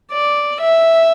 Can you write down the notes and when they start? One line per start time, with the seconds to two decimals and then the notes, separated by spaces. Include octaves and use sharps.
0.12 D5
0.62 E5